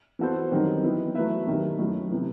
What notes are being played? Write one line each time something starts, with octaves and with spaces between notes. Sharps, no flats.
E3 B3 F#4 A4 C5
F#2 D#3 G3 C4 D#4
E3 B3 E4
F#3 A3 E4 B4 E5
D#2 D#3 F#3
F#2 F#3 A3 E4
C3 E3 B3 E4